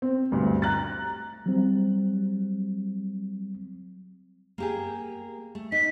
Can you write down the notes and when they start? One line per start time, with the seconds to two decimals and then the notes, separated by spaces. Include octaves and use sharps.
0.02 C4
0.32 D2 G2
0.62 A#5 F#6 A6
1.46 F#3 G3 C4
4.58 A#3 G4 G#4
5.55 A3
5.72 D#4 B6